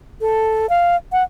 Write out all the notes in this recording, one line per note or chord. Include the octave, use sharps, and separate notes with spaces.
A4
F5
F#5